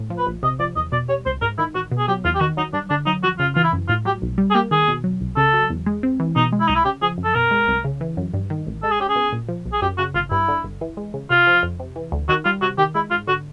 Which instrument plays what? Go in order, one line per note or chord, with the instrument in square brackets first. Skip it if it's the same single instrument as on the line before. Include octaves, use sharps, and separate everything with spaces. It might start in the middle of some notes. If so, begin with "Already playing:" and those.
Already playing: [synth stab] A2
F3
[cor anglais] B4
[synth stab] A#1
[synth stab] C3 [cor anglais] D#5
[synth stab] F3 [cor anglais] D5
[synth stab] E2 [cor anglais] D#5
[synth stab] B2 [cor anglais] D5
[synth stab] G3 [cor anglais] C#5
[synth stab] C#2 [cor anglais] C5
[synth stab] G#2 [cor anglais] A#4
[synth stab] D#3 [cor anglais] E4
[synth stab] A1 [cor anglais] F#4
[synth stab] B2
[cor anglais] G#4
[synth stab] F#3 [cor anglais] G4
[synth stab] E2 [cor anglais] F4
[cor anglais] G4
[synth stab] D#3 [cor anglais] F#4
[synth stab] F#3 [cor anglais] D#4
[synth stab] G2 [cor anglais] D4
[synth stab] D3 [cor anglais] D4
[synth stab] F#3 [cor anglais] D#4
[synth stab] F2 [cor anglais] F#4
[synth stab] C#3 [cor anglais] F4
[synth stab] E3 [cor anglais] F4
[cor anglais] E4
[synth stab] F#2
[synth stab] A2 [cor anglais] F4
[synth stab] F#3 [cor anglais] G4
[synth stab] B1
G3
[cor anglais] G#4
[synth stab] A#3 [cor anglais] G4
[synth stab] D#3 [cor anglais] G#4
[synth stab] B2
F#3
C2
[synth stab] C#3 [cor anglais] A4
[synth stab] F#3
E2
G#3
C4
E3
[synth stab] B2 [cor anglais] D#4
[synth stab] G#3
[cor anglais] E4
[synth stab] C2 [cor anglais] D#4
[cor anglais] E4
[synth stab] C#3 [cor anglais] G4
[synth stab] F3 [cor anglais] G#4
[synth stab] F#2
[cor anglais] A4
[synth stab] B2 [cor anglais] A#4
[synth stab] G#3
C2
C#3
E3
F#2
G2
D#3
A1
[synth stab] G#3 [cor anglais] A4
[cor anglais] G#4
[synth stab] C#4 [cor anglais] G4
[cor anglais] G#4
[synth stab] B2
A#2
F3
B1
[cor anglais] G#4
[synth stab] F#2 [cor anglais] G4
[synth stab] C#3 [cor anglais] F#4
[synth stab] G#1 [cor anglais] F4
[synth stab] G2 [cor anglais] E4
[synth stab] D3
G1
E3
G#3
C#3
[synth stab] C3 [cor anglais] F4
[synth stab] F3
F2
C3
E3
D2
[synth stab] D#3 [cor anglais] F#4
[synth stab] G3 [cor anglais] F4
[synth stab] C3 [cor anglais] F#4
[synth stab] D#3 [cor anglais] G4
[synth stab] G#3 [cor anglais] E4
[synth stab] G#2 [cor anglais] F4
[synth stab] D3 [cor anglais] F#4